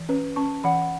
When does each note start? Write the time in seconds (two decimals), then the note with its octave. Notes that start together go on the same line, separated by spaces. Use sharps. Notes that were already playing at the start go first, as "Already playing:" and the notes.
Already playing: E3
0.09 C#4 B4
0.36 C#4 A5 C#6
0.64 E3 F#5 B5